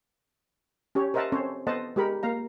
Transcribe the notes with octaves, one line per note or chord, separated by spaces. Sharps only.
C#4 G4 C#5
A#4 C5 D#5 E5 F#5 A5
C4 C#4 A4 C5 C#5
B3 A4 C5 D#5 F#5 A5
G#3 G4 A#4 B5
A#3 F5 A#5